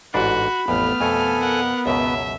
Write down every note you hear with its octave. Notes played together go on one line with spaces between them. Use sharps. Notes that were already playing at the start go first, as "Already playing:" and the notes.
A1 G#2 D4 F#4 B5
A1 F2 A3 B3 F6
F2 B2 A4 G#5
A#4 F#5
C#2 F#2 B2 F#3 E5